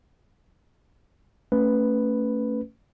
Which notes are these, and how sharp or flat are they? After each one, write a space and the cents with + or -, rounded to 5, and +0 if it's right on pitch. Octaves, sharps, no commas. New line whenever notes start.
A3 +30 C#4 +0 B4 +0